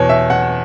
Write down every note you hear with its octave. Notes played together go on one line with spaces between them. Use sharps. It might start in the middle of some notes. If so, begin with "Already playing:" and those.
Already playing: E2 B2 C#5
E5
F#5